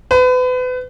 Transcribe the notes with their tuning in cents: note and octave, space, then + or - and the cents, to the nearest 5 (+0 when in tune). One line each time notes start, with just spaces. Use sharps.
B4 +35